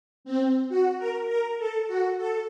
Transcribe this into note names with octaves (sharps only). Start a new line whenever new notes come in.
C4
F#4
A#4
A#4
A4
F#4
A4